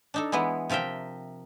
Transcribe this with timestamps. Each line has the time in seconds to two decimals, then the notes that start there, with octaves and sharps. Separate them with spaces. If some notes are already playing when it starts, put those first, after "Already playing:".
0.14 D4 D#4 A4
0.32 E3 G#3 B3 E4
0.69 C3 F3 A#4 E5 G5